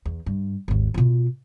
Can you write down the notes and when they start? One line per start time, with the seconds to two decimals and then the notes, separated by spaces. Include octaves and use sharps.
0.06 E2
0.26 G2
0.68 G#1 D#2
0.94 B2 F4